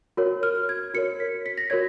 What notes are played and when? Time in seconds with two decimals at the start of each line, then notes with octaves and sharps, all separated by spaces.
0.17 F#4 A#4 C#5
0.43 F6
0.69 G#6
0.94 F#4 A#4 C#5 C#7
1.20 B6
1.46 B6
1.58 A#6
1.70 F#4 A#4 C#5 G#6